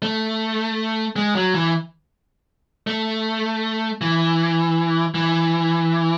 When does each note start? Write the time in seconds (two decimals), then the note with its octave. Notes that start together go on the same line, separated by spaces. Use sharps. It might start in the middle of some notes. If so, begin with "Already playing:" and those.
0.02 A3
1.16 G#3
1.35 F#3
1.54 E3
2.87 A3
4.01 E3
5.15 E3